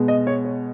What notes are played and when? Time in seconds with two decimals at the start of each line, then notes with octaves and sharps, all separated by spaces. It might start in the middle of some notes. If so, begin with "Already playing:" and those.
Already playing: B2 G#3
0.08 D#5
0.27 C#5
0.45 C#5